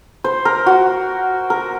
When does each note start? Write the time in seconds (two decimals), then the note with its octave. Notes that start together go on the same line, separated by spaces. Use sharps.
0.24 C5
0.45 A#4
0.66 F#4
1.50 A#4